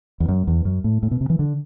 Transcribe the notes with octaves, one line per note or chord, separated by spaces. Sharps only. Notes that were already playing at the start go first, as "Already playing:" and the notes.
E2
F#2
E2
F#2
A2
A2
B2
C3
E3
D3